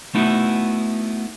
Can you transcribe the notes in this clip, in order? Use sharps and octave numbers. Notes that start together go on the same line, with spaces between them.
A3 B3 D#4 E4 F#4